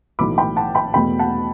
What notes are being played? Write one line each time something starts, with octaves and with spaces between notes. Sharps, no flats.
B1 A2 E3 A3 B5 D6
G5 B5
F#5 A5
G5 B5
E2 B2 A3 G5 B5
F#5 A5